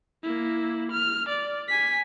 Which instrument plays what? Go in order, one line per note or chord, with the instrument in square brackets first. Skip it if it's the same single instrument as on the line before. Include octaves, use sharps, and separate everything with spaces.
[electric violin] A#3 E4
F6
D5
G#5 B6